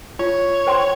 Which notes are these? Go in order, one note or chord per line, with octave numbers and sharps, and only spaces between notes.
F4 C#5
C5 G5 C6